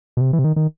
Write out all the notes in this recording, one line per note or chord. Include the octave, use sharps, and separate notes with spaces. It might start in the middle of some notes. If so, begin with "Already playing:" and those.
B2
C3
E3
C3
D#3
D#3